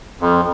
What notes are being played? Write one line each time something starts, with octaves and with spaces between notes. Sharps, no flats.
F2